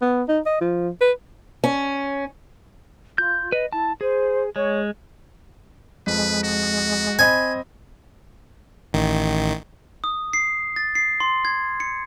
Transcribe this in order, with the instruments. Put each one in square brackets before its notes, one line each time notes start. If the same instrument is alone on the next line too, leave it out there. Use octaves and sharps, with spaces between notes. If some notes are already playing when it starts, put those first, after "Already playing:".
[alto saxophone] B3
D#4
D#5
F3
B4
[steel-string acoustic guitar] C#4
[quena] F4 [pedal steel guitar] G6
[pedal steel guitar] B4 [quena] D#5
[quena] E4 [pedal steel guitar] A5
[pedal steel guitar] G#4 [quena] C5
[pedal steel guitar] G#3 [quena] C#5
[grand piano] F2 [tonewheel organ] G#3 [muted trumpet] B4
[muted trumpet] F#4
[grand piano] C4 D#5 B5 [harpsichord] G#5
[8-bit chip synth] A1 D#3
[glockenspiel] D#6
C7
A6
C7
C6
G#6
C#7